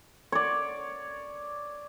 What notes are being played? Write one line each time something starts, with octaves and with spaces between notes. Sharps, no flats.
C#5 D5